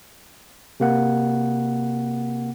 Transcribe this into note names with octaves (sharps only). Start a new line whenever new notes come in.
C3 A#3 F#5